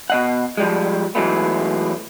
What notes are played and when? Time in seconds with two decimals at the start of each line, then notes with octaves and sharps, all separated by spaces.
0.10 B2 D#5 F#5
0.57 F3 G3 G#3
1.15 E3 F#3 G#3 A3 B3